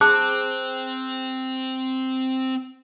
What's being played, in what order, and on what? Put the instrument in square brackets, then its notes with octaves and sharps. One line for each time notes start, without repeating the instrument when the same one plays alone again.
[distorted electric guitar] C4 [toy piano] G#4 A5 D6 [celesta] F#6